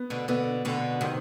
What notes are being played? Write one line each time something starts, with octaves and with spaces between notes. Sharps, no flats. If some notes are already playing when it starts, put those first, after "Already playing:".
Already playing: B3
B2 D3
B2 D3 B3
B2 D3
C3 D#3